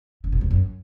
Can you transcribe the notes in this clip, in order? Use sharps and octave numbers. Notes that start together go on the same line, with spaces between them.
D3
B2
E2
F#2